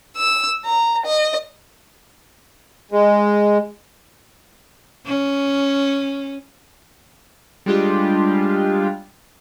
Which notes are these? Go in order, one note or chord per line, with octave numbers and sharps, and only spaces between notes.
E6
A#5
D#5
G#3
C#4
G3 G#3 D4 F4 G4